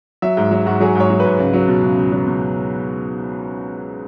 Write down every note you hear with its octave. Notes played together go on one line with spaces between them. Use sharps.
F#3 E5
G#2
F#3
G#2 F#4
F#3 G#4
G#2 C#5
F#3
B4
G#2
C#2
F#3
B2
C#2
C#2
F#3
B2